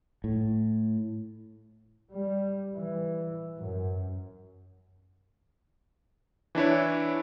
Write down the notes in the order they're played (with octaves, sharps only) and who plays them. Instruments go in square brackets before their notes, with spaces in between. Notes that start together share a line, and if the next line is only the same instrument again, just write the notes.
[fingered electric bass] A2
[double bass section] G3
E3
F#2
[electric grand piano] E3 D4 E4 C#5